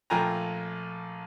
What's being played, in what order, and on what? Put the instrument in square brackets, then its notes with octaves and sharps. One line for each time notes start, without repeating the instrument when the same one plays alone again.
[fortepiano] A#1 A3 F4 G5 G#5 A#5